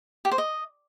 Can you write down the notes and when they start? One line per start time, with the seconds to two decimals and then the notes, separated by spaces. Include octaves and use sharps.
0.25 G4
0.32 C5
0.38 D#5